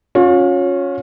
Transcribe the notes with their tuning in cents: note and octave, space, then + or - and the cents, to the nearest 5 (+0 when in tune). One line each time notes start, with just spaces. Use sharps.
C#4 +0 F4 +40